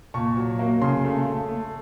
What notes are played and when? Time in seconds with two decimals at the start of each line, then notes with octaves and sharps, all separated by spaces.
0.14 A#2 C#6
0.37 F#3
0.59 A#3
0.82 C#3 C6
1.04 A3
1.26 A3
1.49 A3